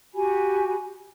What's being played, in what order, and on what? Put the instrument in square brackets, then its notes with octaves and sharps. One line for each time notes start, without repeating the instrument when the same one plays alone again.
[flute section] F#4 G4 G#5 B5